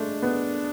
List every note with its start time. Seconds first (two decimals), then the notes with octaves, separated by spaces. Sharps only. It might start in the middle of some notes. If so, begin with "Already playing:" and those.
Already playing: G#3 A3 D4
0.22 B3